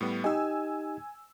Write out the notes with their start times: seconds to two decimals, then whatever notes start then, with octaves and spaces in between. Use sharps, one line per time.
0.01 A2 G3 B3
0.24 D#4 G4 D#5 G#5 E6